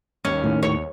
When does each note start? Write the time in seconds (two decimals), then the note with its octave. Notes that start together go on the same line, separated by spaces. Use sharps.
0.25 D#2 C#4
0.44 A2 D#3
0.63 D#2 C#5